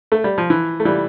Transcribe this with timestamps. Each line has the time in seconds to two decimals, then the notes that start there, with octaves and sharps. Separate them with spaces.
0.12 A3
0.24 G3
0.38 F3
0.50 E3
0.80 A3
0.85 E3 G3